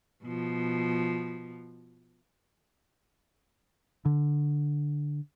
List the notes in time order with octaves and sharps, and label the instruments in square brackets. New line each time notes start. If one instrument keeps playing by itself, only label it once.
[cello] B2 F3
[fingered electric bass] D3